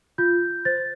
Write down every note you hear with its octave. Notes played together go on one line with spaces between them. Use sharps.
F4 G6
C5 A6